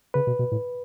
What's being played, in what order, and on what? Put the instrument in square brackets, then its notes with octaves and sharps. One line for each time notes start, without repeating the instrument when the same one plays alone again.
[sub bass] C#3 [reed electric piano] B4
[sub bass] B2
B2
A2